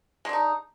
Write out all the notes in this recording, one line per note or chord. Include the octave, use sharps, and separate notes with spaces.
G#3 D4 D#4